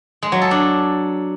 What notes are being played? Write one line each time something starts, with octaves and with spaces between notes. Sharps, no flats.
G#3
F#3
A4
D4